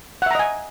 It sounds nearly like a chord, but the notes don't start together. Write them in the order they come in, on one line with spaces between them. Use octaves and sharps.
F#5 E5 A#5 D#5 G#5